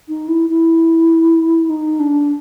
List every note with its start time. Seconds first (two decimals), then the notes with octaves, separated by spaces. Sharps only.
0.08 D#4
0.28 E4
0.49 E4
1.70 D#4
2.00 D4